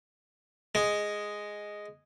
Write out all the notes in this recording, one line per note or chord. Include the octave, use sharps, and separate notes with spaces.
G#3